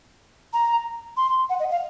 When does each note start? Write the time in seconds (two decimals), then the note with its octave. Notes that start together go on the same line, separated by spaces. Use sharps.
0.53 A#5
1.17 C6
1.50 F#5
1.60 D#5
1.71 F5